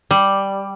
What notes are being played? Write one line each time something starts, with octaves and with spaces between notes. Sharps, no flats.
G3